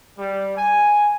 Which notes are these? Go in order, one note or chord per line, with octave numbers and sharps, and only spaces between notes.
G3
G#5